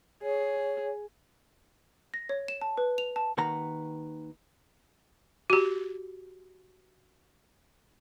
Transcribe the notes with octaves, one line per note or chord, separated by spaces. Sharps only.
G#4 C#5
A#6
C#5
E7
A5
B4
F7
A5
D#2 D#3 B4 F#5 A#5
F#4 G4